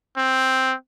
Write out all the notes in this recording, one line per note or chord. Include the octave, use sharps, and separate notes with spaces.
C4